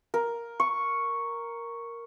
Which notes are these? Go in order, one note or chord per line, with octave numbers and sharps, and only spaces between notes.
A#4
C#6